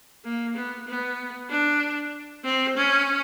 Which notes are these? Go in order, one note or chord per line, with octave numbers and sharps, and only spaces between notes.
A#3
B3
B3
D4
C4
C#4